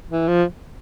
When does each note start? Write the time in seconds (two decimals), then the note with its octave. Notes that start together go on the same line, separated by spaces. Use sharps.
0.10 E3
0.28 F3